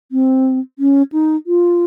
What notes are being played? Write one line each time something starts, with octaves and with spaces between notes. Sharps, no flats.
C4
C#4
D#4
F4